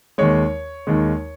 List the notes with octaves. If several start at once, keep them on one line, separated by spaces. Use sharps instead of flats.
D#2 D#3 G#3 C#5
D#2 D#3 G#3